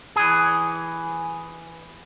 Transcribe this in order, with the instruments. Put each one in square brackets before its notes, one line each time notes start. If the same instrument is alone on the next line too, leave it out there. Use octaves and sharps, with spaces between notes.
[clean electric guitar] E3 G#4